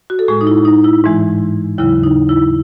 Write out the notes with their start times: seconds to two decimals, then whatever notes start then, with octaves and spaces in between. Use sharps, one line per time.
0.10 F#4
0.19 A4
0.28 A2 G#3 G#4
0.41 D#4
0.47 E4
0.65 D#4
0.84 E4
1.04 G#2 E3 G#3
1.78 D#2 C#3 F#3 E4
2.03 D#4
2.29 E4